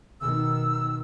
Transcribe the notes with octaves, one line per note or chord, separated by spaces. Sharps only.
B2 D#3 E6